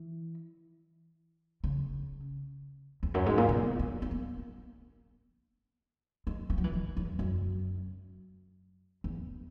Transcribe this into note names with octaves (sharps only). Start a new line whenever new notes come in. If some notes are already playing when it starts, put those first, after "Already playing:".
Already playing: E3
C#3
E2
F#2
G#2
A#2
B2
G#3
B3
A#3
G#3
E3
F#3
E3
D#3
E2
F#2
E2